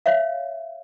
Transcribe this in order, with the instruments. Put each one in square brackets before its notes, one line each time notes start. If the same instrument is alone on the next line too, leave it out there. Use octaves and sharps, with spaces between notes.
[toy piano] C#5 E5 F5